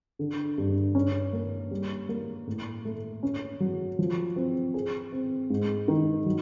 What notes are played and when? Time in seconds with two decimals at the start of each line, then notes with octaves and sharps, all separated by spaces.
0.19 D3
0.58 G2
0.95 C#4
1.33 A#3
1.71 G3
2.09 A#3
2.47 A2
2.85 A3
3.23 C#4
3.60 F#3
3.99 F3
4.36 C4
4.74 G#4
5.12 C4
5.50 G#2
5.88 D#3
6.26 F#3